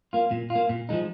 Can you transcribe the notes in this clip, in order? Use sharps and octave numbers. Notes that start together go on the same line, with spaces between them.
A#3 F4
A#2
F4
A#3
A#2
F3 G#3 D#4